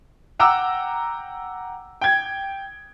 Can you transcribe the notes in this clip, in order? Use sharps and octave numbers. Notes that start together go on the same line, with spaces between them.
F#5 G5 A#5 D6 E6
G5 G#6